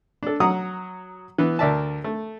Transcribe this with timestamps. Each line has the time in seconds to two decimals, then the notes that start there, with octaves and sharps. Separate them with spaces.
0.23 D4 A4
0.40 F#3 F#5 A#5 D#6
1.38 E3 B3
1.59 D2 A#4 D5 E5 A5
2.04 A3